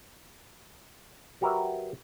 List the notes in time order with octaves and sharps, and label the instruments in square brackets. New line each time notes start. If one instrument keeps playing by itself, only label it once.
[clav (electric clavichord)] F#3 F#4 G4 A#4 B4 E5